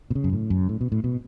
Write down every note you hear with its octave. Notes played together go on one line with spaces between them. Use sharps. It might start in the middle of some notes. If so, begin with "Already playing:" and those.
B2
C#3
F#2
A2
F#2
A2
B2
A2
B2